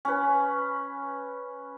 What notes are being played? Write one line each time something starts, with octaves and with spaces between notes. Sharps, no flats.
C#4 B4